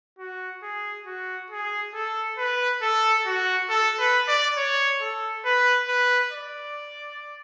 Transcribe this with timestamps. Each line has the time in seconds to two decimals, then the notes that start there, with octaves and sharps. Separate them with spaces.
0.19 F#4
0.63 G#4
1.06 F#4
1.50 G#4
1.94 A4
2.38 B4
2.82 A4
3.26 F#4
3.69 A4
3.99 B4
4.28 D5
4.57 C#5
5.00 A4
5.45 B4
5.88 B4
6.32 D5